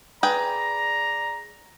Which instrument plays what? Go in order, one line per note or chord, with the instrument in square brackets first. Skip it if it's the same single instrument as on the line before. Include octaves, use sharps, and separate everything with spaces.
[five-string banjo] G#4 B4 G5 [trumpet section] D5 A#5